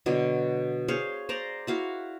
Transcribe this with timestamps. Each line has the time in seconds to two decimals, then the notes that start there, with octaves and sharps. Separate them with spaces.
0.06 B2 D3 F#3
0.88 G#4 C5 C#5 F5
1.29 C5 D5 A#5
1.67 E4 F#4 F5